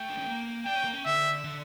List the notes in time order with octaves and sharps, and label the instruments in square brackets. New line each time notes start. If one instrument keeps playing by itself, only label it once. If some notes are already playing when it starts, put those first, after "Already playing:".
Already playing: [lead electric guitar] A3 [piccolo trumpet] G5
[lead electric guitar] D4
C#4
A#3
[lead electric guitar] D4 [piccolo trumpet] G5
[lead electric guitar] C#4
A#3
C#4
[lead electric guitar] D3 [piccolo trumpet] E5
[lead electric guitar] D3